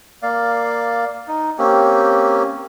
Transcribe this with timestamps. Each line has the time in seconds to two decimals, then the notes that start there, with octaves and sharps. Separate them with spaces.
0.23 A#3 D5 F5
1.28 D#4
1.59 A#3 C4 C#4 G4